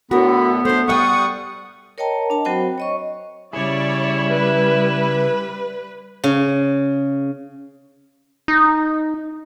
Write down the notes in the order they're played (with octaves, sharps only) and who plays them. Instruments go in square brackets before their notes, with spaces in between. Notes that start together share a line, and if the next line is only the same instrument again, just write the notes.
[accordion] A2 D3 [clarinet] B3 [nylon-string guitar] F#4 A#4 [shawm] B5
[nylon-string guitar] A3 D4 [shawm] C5
[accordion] G3 F#5 D#6 [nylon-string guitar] A3 E5 G5 [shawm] C#6
[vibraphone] A#4 C#5 D#5 G5 A5 A#5
D4 A5
F#3 C4 F#4 C5 G5 B5
C#5 D#5 C#6
[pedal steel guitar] C#3 G#4 [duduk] G3 [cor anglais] E4 [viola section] C#5 D5
[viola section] B4
[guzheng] C#3
[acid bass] D#4